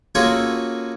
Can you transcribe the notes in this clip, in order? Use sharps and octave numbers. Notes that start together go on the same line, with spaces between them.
A#3 C#4 F4 F#4 G#4 A4